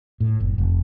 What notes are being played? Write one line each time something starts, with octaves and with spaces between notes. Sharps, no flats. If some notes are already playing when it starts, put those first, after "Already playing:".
A2
F#1
F1